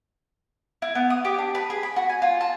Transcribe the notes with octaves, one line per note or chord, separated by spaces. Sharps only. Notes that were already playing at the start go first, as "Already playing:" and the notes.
E4
B3
D#6
G4
D4
B4
G#4
B5
F#4
G#5
F4
A5